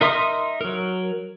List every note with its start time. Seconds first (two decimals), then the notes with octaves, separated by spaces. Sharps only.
0.01 D#4 A#4 E5 C6 D#6
0.61 F#3 A#4